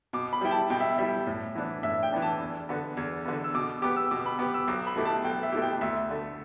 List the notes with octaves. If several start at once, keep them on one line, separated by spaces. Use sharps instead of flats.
B2 D6
B5
G3 E4 G5
A5
B2 G5
E5
G3 E4 E5
A2
E3 B3 D4
A2 E5
G5
E3 B3 D4
A5
E2
D3 B3
E2
D3 B3
E6
B2 D6
B3 G4 D6
E6
B2 D6
B5
B3 G4 D6
E6
B1 D6
B5
B2 A3 E4 G4
A5
B1 G5
E5
B2 A3 E4 G4
G5
D2 E5
D3 A3